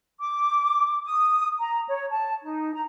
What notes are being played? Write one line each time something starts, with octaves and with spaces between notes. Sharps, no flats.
D6
D#6
A#5
C#5
A5
D#4
A#5